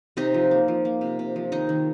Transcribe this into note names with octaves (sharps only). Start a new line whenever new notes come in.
C3 D#4 D#5
F3
A#3
F3
A#3
C3
C3
F3
D#3 D#4 D#5
D#3